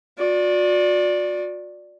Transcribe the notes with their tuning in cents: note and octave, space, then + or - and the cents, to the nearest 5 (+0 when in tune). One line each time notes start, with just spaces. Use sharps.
F#4 -45 D5 +0